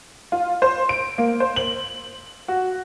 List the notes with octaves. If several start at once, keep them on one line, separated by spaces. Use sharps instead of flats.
F4
C5
D7
A#3
C5
F#7
F#4